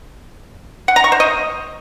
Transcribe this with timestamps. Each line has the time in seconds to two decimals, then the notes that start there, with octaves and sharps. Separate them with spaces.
0.88 F#5
0.96 A#5
1.04 C#6
1.12 C5
1.20 D#5